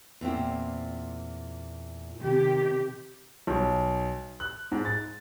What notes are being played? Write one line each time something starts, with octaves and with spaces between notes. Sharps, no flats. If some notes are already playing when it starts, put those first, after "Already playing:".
E2 A#2 C4
C3 D#3 G4
B1
F#6
G#2
A6